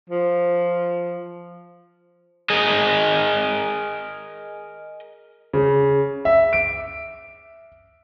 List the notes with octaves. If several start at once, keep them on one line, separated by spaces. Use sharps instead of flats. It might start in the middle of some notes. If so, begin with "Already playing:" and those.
F3
G#4 A#4 D#5
C#3
E5
D7